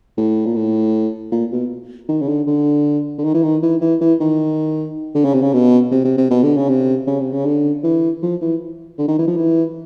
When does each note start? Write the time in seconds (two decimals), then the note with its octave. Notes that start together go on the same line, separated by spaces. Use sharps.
0.17 A2
0.46 A#2
0.56 A2
1.32 A#2
1.52 B2
2.09 D#3
2.22 C#3
2.28 D3
2.47 D3
3.18 D3
3.24 D#3
3.34 E3
3.43 D#3
3.63 E3
3.81 E3
4.01 E3
4.20 D#3
5.15 D3
5.25 C#3
5.33 C3
5.42 C#3
5.53 B2
5.92 C3
6.04 C3
6.18 C3
6.31 B2
6.43 D3
6.57 C#3
6.69 C3
7.07 C#3
7.20 C3
7.33 C#3
7.46 D3
7.84 E3
8.23 F3
8.42 E3
8.98 D3
9.08 D#3
9.18 E3
9.27 F3
9.37 E3